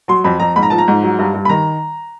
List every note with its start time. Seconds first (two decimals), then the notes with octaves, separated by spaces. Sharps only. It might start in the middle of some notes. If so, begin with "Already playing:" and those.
0.08 F#3 C6
0.24 F2 B5
0.40 F2 A#5
0.56 G#2 B5
0.63 A#5
0.70 F3 A5
0.78 A#5
0.88 G#2
1.03 F#3
1.19 G2
1.34 G2
1.45 B5
1.49 D#3 A#5